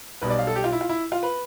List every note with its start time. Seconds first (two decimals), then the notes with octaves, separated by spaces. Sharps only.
0.22 B1 B2 G3 B4
0.30 D5
0.39 F5
0.47 A4
0.56 G4
0.64 F4
0.72 E4
0.81 F4
0.89 E4
1.12 F4
1.23 B4